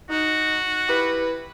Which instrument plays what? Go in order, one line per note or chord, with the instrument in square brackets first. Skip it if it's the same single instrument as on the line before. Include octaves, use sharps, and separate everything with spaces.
[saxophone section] D#4 [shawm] F#4
[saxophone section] E4 G4 B4